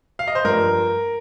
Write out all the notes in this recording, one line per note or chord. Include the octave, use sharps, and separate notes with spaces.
F5
D#5
C5
G2 F3 A#4